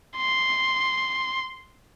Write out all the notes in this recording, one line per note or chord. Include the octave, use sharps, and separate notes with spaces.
C6